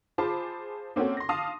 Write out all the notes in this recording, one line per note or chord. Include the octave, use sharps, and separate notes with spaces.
F4 G#4 C5 A5 B5 D6
A#3 C4 C#4 F#4 A4
C6 A#6
F5 A5 C6 D6 D#6